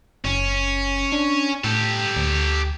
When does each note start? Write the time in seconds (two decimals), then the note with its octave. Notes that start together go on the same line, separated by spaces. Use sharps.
0.25 F#1 C#4
1.12 D4
1.64 A2 G4 A4
2.17 D2